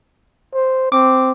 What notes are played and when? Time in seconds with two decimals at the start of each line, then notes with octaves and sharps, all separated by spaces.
0.54 C5
0.92 C4 D6